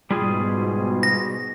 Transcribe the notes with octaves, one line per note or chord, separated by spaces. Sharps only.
G#2 B2 G3 F4 G#4
A#6